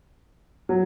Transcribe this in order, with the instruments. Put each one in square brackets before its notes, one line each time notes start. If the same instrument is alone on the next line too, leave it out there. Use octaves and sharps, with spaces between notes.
[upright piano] F#3